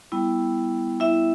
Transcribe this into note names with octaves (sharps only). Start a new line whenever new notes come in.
G3 B3 E4
E4 E5